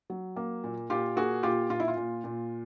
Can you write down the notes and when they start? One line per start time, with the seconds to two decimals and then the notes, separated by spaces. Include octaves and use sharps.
0.10 F#3
0.36 A#3
0.64 A#2
0.90 A#2 F4 G4
1.16 A#3 F#4 G#4
1.43 A#2 F4 G4
1.70 A#2 F4
1.80 E4
1.88 F4
1.97 A#2
2.24 A#2